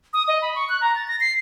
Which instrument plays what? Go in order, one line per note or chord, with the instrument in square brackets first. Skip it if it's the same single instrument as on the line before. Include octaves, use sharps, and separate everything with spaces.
[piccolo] D#6
D#5
B5
C#6
F#6
A#5
A6
A#6
C7